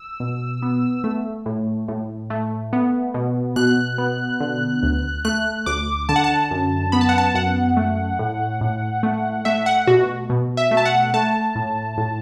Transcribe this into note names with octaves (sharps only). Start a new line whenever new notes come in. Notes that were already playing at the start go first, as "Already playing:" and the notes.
Already playing: E6
B2
B3
A3
A2
A2
A3
B3
B2
B2 F#6
B3
D3
D2
A3 F#6
D2 D6
D3 A5
F#5
A5
F#2
B3 B5
A5
F#5
A5
F#2 F#5
A3
A2
A2
A3
A3 E5
F#5
B2 F#4
B2
E5
A3
A5
F#5
A3 A5
A2
A2